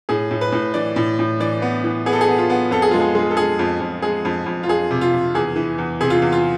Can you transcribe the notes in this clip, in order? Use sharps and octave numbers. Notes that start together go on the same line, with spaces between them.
A2 G#4
A2
B4
A2
E3 D5
A2
A2
E3 D5
B3
E3
B3 G#4
A4
G#4
B3
F4
B3
F2 A4
G#4
G#3 F4
G#4
G#3
A4
G#3 G#4
F2
F2
G#3 G#4
F2
F2
F4
F2 G#4
C3
F4
C3
E2 G#4
E3
E2
C3 G#4
F4
E2
F4